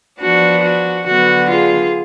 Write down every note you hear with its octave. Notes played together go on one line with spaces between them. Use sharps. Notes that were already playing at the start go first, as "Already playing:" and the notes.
F3 B3 D4 F#4
F#4
D3 F#3 B3 D4 F#4
F4 G#4